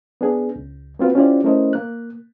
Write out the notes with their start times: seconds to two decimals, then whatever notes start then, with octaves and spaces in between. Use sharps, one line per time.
0.21 B3 D4 G#4
0.56 C#2
0.99 A#3 C4 F4 F#4 B4
1.15 C#4 E4 F4 G4 C5 D5
1.44 A3 C#4 E4 A#4 C5 D#5
1.73 A#3 F#6